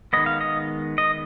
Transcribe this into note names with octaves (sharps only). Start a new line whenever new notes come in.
D#3 G#3 B3 D#5
F5
D#5
D#5